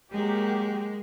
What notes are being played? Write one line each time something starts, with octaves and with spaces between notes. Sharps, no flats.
F#3 G#3 A#3 G4